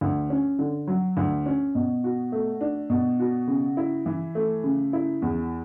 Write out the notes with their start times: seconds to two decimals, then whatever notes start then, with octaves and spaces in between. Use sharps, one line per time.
0.01 D2
0.30 C#4
0.59 D3
0.87 F#3
1.17 D2
1.46 C#4
1.75 B2
2.04 F#4
2.32 A3
2.61 D4
2.90 B2
3.20 F#4
3.48 C#3
3.77 E4
4.06 E3
4.35 A3
4.64 C#3
4.93 E4
5.22 E2